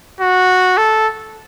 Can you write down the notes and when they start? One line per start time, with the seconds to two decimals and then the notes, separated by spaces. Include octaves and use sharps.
0.21 F#4
0.77 A4